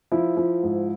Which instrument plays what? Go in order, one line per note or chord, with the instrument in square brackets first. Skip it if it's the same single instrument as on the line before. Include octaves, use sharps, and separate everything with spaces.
[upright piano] F3 E4
F3
G#2